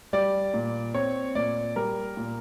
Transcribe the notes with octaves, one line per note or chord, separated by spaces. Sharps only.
G3 D5
A#2
C4 C#5
A#2 D5
G3 A#4
A#2